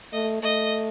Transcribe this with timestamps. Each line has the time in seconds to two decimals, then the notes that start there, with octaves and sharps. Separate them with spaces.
0.13 A3 D#5
0.42 A3 D#5